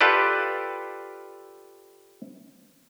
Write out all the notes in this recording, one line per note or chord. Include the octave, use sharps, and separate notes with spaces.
F4 G4 A4 B4 D5